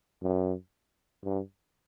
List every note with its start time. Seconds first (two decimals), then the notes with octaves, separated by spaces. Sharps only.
0.22 F#2
1.24 G2